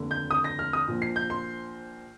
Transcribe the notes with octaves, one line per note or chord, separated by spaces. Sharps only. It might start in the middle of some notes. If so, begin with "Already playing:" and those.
Already playing: F1 D#2 D3
G6
D#6
A#6
F6
D#6
A#1 A#2 F3
C7
G6
C6